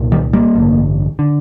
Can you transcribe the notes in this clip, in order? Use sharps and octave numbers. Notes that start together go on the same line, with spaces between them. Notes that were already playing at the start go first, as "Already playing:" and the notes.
Already playing: C2 A#2
D#3 G3
G3 A#3
A1 G2 D3
D3